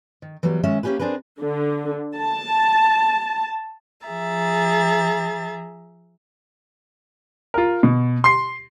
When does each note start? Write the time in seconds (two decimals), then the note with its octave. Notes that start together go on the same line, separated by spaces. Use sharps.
0.22 D#3
0.43 E3 F#3 G3 B3
0.63 D#3 G#3 C#4 E5
0.83 A#3 C#4 D4 G4 G#4 B4
0.99 C4 D4 G#4 A#4 B4
1.40 D3
2.15 A5
4.05 F3 G#4 E5 A#5 A6
7.54 F4 A#4
7.83 B2
8.24 C6 C7